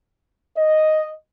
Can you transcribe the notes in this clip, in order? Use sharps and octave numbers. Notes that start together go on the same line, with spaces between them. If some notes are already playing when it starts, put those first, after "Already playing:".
D#5